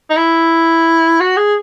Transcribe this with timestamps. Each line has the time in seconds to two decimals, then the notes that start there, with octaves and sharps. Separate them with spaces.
0.10 D#4
0.16 E4
1.20 F#4
1.37 G#4